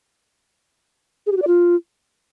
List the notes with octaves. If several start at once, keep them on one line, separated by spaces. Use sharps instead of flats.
G#4
G4
F#4
D5
F4